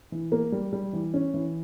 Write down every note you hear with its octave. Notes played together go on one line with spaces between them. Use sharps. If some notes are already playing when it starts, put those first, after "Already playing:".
E3
A#3
G3
G3
E3
C#4
E3